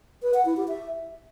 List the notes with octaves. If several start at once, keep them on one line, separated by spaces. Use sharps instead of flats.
B4
F#5
E4
G4
E5